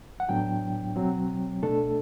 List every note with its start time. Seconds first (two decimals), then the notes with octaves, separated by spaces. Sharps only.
0.20 F#5
0.29 A2 F#3 B3 D4 G5
0.96 B2 F#3 C4
1.63 B2 A3 D4 A4